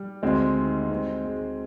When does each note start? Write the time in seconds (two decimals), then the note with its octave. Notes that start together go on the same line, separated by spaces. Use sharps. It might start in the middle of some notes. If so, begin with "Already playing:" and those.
Already playing: G3
0.23 D2 G#3 C4
0.56 D#3
0.90 C4
1.24 G#3